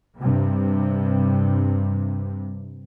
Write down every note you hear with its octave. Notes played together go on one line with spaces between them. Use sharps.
G2 C3